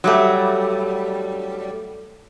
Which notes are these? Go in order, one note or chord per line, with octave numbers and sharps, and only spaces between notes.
F#3 G3 A3